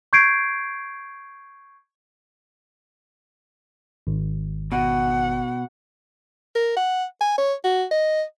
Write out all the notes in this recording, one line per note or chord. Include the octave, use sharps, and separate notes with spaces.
C#6 G6 G#6 C7 D7
G#1
B2 F#5
A#4
F#5
G#5
C#5
F#4
D#5